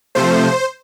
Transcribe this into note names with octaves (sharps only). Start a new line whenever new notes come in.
C3 F3 A3 C5